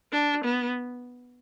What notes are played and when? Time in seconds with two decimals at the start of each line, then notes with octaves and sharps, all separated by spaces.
0.12 D4
0.44 B3